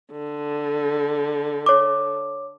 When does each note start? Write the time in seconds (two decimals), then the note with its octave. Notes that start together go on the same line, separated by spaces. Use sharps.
0.12 D3
1.66 C#5 D6